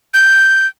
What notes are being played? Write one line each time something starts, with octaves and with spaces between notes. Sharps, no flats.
G6